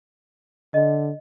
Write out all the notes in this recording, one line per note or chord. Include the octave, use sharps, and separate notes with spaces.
D3 D#5